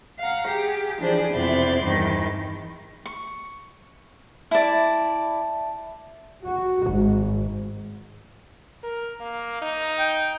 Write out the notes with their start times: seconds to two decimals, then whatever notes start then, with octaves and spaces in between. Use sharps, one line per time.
0.19 F5 F#5 A#5
0.48 G4 G#4
1.00 E3 F3 D4 G#4 C5 D5
1.31 F2 C3 B3 E4 D5 C6
1.84 E2 G2 D#3 E3
3.06 C#6
4.51 E4 D5 E5 A5
6.44 F#4
6.89 G#1
8.83 A#4
9.21 A#3
9.62 D#4
9.99 G5